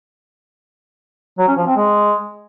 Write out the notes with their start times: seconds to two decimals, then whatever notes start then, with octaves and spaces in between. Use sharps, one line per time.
1.38 F#3
1.48 C#4
1.57 F3
1.67 C4
1.76 G#3